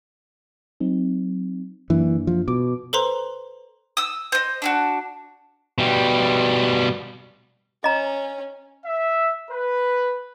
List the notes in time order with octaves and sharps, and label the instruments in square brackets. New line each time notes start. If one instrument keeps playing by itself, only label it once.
[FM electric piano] F#3 C4 D#4
[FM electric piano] F#2 A#3 D4 [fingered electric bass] E3
[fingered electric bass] F3
[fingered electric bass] B2 [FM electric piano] D6
[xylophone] A4 B4 C5 A#5 C6
[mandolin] D#6 E6
C5 D#5
D4 F4 F#4
[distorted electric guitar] B2 G3
[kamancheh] C#4 [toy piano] D#5 A#5
[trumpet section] E5
B4